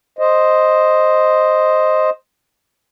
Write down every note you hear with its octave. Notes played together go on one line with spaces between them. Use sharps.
C5 D#5